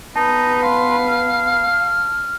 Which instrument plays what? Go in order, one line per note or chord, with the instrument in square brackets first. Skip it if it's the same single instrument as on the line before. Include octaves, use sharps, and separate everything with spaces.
[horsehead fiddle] B3 B4 [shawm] D#4 [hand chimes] A5
[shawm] F5 [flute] C6
[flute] F6